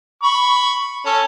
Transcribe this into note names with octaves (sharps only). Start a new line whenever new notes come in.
B5 C#6
C#4 A4